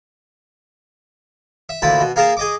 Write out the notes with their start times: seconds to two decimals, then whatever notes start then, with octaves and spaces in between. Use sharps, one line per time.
1.69 E5
1.82 D2 A#2 E4 A5 B5
2.01 B2
2.16 A#3 G#4 A#4 F5 A5
2.37 G#4 D#5 D6